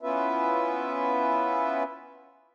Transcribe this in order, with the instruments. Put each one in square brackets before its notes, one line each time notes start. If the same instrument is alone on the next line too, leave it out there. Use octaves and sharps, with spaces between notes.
[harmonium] B3 C#4 E4 F4 B4 E5